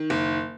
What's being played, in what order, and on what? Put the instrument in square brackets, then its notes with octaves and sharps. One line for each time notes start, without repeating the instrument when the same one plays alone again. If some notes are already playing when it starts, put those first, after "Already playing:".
Already playing: [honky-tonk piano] D#3
F#1